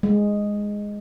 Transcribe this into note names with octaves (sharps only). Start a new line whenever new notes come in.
G#3